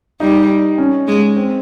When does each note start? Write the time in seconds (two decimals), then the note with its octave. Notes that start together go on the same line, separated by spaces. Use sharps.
0.20 G3 D#4
0.78 C#4
1.07 G#3
1.36 C4